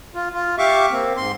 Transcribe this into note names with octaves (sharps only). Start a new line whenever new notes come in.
F4
F4
G4 E5 F5 C#6 D6
A#3 C4
G#2 C6